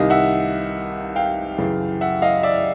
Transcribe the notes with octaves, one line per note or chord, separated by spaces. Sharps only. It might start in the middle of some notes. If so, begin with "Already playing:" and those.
Already playing: C2 C3 D#3 D#5 F5
E5 F#5
F5 G5
F#2 C#3 E3
E5 F#5
D#5 F5
D5 E5